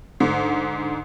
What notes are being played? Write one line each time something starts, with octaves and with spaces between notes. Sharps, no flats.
G#2 D3